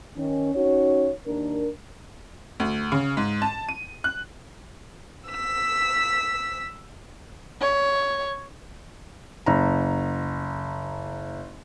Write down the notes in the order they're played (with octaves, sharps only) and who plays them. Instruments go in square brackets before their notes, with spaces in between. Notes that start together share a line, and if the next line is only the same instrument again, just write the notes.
[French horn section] D#3 C#4
C#4 D#4 F#4 C#5
D#2 D4 A#4
[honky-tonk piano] D2
C#3
G#2
A5
D#7
F#6
[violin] E6 B6
[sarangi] C#5
[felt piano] F#1 A#5